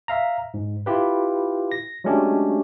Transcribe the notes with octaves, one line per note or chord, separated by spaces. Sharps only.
E5 F5 A#5
G#2
E4 F4 G4 B4
A#6
F#3 G#3 A3 C#4 D4 G4